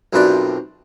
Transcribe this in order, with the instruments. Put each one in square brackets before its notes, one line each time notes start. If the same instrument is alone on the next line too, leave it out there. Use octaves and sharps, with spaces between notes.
[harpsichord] B1 F#2 C3 F3 B4 D5